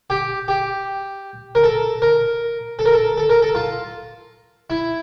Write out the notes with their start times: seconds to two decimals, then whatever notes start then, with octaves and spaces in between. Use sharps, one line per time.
0.10 G4
0.48 G4
1.55 A#4
1.64 A4
2.02 A#4
2.79 A4
2.86 A#4
2.93 A4
3.18 A4
3.29 A#4
3.42 A4
3.55 F4
4.70 E4